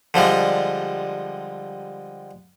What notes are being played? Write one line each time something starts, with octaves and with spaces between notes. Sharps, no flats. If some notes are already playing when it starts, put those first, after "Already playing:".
D3 F3 G3 G#3